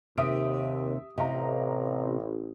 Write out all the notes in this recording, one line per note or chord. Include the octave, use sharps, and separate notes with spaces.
D#2 C3 E5 D#6 D7
A1 C3 D#5 F5 A#5